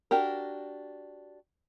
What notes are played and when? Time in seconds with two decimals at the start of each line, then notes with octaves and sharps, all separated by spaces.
0.11 D4 F#4 G4 A#4